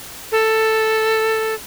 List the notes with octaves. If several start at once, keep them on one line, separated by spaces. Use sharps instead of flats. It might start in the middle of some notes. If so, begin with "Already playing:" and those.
A4